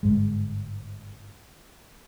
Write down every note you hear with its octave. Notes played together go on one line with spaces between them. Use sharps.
G1 G#2 G#3